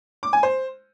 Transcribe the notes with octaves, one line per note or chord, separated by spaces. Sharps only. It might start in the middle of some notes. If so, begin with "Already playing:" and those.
D6
G#5
C5